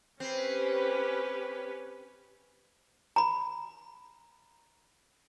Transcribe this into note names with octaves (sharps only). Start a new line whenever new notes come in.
C4 C#4 G4 B4
A#5 B5